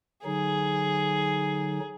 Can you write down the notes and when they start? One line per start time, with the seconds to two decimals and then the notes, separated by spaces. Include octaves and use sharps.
0.25 D3 F#3 D#4 G#4